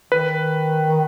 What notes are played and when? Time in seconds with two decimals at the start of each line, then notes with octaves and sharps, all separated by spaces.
0.12 D#3 B4